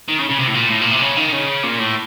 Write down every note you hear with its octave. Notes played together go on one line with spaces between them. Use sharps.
D#3
C#3
C#3
C3
A2
A#2
A2
A#2
C3
C#3
D#3
C#3
A#2
A2